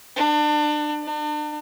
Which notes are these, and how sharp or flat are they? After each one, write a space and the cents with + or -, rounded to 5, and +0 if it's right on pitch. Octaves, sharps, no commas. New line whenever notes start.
D4 +30
D4 +40